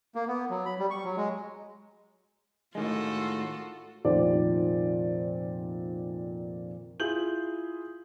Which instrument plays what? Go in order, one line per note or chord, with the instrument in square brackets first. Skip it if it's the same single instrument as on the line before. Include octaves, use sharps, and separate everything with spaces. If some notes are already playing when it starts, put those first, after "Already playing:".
[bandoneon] A#3
B3
F#3
B5
G3
C#6
F#3
G#3
[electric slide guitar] A2 D#3 G#3 [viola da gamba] F4 F#4 A4
[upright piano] F1 A#2 D#3 C5 D5
[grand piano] E4 F4 G#4 G6 F#7